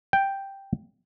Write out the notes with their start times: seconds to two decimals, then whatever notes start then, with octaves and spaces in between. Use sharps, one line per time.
0.13 G5